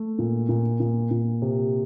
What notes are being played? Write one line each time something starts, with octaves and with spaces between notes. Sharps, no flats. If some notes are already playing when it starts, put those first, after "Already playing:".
Already playing: A3
A#2
A#2
A#2
A#2
C3